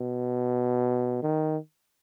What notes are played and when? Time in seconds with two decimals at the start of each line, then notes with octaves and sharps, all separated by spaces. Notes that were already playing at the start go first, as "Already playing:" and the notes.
Already playing: B2
1.23 D#3